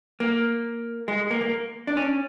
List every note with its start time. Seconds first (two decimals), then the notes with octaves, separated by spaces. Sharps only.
0.20 A#3
1.08 G#3
1.31 A#3
1.41 A#3
1.87 D4
1.97 C#4